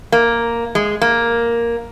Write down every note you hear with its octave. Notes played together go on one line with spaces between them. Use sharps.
A#3
G#3
A#3